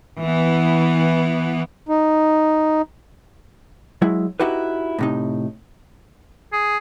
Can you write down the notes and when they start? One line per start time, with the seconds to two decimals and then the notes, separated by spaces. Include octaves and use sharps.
0.20 E3 B3
1.89 D#4
4.02 F#3 G#3 E4
4.40 D#4 E4 F#4 G4 B4
4.99 A2 C3 D#4
6.53 G#4